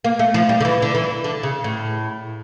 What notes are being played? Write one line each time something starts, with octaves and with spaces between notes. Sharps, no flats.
A#3
A3
F3
G3
D3
E3
D3
E3
D3
C#3
A2